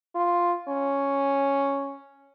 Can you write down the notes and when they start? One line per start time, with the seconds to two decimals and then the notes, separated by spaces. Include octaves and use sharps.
0.15 F4
0.68 C#4